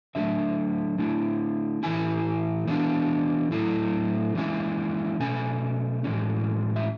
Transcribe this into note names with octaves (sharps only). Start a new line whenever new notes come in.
D3 F#3 A3 E5
D3 A3 E4
A2 E3 A3 E4 G#5
E3 B3 D4
A2 F#3 A3 E4
E3 G#3 C#4 E4
B2 A3 C#4 G#5
A2 E3 G#3 C#4
E5